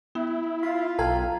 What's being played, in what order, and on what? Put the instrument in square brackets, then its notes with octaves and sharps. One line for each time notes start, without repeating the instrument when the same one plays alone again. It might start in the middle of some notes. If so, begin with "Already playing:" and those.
[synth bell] B3 [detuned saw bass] E4
[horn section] F4 [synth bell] B6
[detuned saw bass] B1 [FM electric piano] A4 F5 [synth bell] G5 A#5 G#6